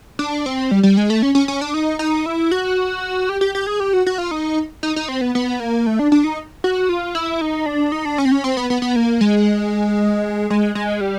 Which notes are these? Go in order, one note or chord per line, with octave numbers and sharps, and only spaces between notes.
D4
C4
G3
G3
G#3
A3
C#4
C#4
C#4
D4
D#4
D#4
E4
F#4
G4
G4
G4
G#4
G4
F#4
F#4
F4
D#4
D#4
D#4
C4
B3
B3
A#3
A3
D4
D4
D#4
F#4
F4
E4
D#4
D4
D#4
D4
C#4
C4
C#4
C4
B3
B3
B3
A#3
G#3
G#3
G#3
G3